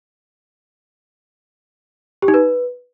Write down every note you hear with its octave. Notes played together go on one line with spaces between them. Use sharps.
G4
D#4
B4